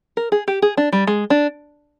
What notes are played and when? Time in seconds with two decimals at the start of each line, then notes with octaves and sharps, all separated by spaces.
0.17 A#4
0.32 G#4
0.48 G4
0.62 G#4
0.77 D4
0.92 G3
1.07 G#3
1.30 D4